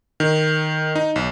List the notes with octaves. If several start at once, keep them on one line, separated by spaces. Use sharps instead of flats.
D#3
D#4
B1